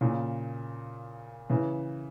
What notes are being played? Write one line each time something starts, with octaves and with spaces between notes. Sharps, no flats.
A#2 C#3
C#3 E3